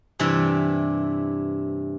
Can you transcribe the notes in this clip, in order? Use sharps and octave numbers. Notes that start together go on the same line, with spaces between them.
G2 C3 E3 D5 E5